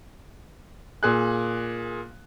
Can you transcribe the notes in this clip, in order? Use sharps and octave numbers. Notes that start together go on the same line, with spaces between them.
A#2 G#4 F#6